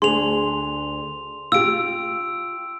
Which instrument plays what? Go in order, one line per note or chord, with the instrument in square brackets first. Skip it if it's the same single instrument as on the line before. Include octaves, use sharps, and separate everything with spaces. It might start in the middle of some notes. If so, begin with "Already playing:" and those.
[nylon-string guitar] D2 D4 G#4 [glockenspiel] C6 F7
[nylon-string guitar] F4 G4 [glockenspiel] E6 D7